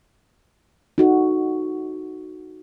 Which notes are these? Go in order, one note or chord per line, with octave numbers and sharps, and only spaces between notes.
D#4 F#4 A4